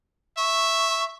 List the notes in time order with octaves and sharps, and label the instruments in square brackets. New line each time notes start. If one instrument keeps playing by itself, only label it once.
[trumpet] E5 [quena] C#6